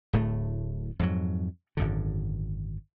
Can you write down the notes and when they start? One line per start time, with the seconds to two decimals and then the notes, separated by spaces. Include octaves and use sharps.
0.13 D1 A2 A3
0.99 F2 G#2 F#3
1.77 G#1 F#2 D3